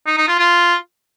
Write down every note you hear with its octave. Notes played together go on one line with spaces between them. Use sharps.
D#4
D#4
F4
F4